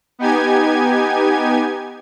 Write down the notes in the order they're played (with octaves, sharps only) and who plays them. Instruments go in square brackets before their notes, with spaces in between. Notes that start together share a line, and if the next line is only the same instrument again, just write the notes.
[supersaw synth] B3 D#4 G4 G#5 G#6